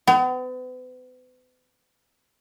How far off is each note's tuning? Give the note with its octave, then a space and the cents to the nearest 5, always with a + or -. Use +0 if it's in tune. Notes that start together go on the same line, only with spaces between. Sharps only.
B3 +40